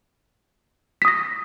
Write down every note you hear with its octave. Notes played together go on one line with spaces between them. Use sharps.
D#6 A#6 B6